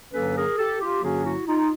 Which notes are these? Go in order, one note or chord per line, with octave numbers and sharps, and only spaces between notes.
G2 D3 F#3 A#3 C#4 A4 B4
G#4 A#4
G4 A4
F4 G4
G2 D3 F#3 A#3 C#4 F#4 G#4
E4 F#4
D#4 F4